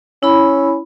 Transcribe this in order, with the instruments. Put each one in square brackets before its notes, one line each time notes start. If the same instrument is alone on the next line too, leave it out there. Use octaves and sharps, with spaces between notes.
[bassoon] C#4 [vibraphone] E4 B5